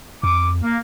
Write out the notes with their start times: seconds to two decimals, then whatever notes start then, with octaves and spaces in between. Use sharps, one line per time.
0.23 F2 D6
0.63 A#3